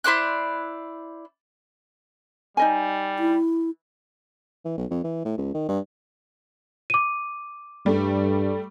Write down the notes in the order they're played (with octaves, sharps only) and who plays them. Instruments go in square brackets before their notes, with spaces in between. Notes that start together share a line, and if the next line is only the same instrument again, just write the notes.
[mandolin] E4 C5 D5 F#6
[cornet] G3 [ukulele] D#4 D#5 G#5
[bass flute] E4
[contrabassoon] E3
B1
F2
E3
A2
C#2
D#3
G2
[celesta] D6 D#7
[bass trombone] G2 [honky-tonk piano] G3 A3